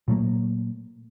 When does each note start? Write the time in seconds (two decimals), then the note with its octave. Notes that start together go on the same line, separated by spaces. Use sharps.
0.08 A#2 F#3 A3 A#3